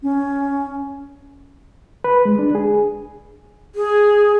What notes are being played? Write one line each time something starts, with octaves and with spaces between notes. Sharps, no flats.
C#4
B4
G#3
D4
G#4
G#4